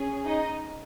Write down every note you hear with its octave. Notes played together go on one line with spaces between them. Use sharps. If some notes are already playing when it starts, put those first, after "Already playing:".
Already playing: C#4 G#4
D#4 D#5